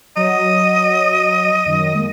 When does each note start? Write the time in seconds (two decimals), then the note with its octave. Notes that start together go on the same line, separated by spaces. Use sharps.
0.16 F#3 D#5
1.66 F#2 D#3 A#6
1.95 G#3 A#3